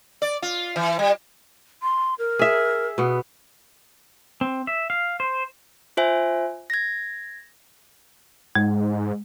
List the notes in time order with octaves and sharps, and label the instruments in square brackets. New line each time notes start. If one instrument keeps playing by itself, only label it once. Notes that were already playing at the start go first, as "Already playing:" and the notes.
[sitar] D5
F4
E3
G3
[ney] C6
A#4
[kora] G#4 E5
B2 B3
[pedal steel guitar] C4
E5
F5
C5
[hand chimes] F4 C5 E5 G#5
G#6 A#6
[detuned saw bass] G#2 [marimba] G#3